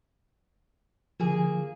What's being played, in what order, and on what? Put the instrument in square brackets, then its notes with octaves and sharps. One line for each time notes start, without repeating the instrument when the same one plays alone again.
[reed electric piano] D3 F3 [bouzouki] A#3 G#4